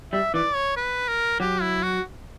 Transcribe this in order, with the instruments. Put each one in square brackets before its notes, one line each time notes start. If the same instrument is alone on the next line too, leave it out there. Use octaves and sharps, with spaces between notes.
[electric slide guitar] G3 [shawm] E5
[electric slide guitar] E3 [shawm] D5
[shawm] C#5
B4
A#4
[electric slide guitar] F#3 [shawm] G4
[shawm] E4
F#4